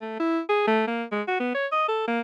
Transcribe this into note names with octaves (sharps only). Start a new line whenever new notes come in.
A3
E4
G#4
A3
A#3
G#3
F#4
B3
C#5
D#5
A4
A#3